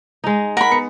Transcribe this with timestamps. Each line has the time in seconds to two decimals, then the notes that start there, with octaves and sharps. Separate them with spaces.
0.24 G#3 D#4
0.57 A#4 F#5 B5
0.71 B3 C#7